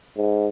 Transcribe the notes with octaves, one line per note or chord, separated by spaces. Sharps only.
G#2